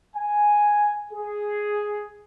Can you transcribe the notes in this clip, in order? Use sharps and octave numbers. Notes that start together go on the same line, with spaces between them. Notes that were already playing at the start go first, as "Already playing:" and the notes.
G#5
G#4